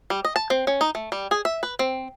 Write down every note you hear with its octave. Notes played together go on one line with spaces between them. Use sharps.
G3
D#5
A5
C4
C#4
D#4
A3
G3
G#4
E5
B4
C4